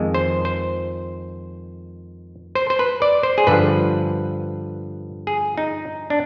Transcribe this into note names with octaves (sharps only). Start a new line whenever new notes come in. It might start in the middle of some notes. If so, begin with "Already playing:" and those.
Already playing: F2 D#3 G#3
C5
C5
C5
C5
B4
D5
C5
G#4
G2 D3 F3 B4
G#4
D#4
D4